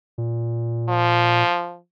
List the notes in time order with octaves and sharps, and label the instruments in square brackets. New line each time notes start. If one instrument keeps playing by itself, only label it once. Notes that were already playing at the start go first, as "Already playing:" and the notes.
[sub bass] A#2
[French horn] F3